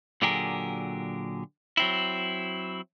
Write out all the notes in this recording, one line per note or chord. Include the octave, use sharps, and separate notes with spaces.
A#2 D3 F#3 G4 G#4 A#4
F#3 C4 E4